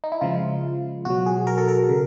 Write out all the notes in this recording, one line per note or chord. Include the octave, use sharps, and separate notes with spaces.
D#4
E4
C#3 F3 G#3 F4
B2 F#3 F#4
G#4
A#4
A4
A#4
C#3